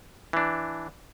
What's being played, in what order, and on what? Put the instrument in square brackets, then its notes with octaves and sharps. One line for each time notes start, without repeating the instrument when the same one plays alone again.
[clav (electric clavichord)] E3 D4